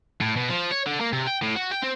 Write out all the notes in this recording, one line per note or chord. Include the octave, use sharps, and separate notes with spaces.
A2
B2
F3
C#5
D3
A#3
C3
G5
A2
F#4
G5
C4